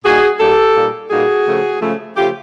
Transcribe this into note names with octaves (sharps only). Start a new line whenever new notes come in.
A#2 G3 A#3 D#4 F#4 G#4
A#2 G3 A#3 D#4 G4 A4
A#2 G3 A#3 D#4
A#2 G3 A#3 D#4 F#4 G#4
C#3 F3 A3
C#3 F3 A3
C#3 F3 A3 F4 G4